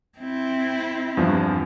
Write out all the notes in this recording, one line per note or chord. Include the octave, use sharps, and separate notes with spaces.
C4 E4
E2 G2 F3